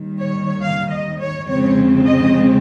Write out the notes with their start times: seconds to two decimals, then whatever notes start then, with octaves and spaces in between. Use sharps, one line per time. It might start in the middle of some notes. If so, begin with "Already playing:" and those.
Already playing: D#2 D#3 G3
0.19 C#5
0.62 F5
0.91 D#5
1.20 C#5
1.49 F2 C#3 G#3 C4 C#5
2.06 D#5